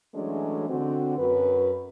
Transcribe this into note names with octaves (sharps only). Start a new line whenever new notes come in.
E3 F#3 G#3 A3 C#4 D4
D3 C4 F#4
F#2 B4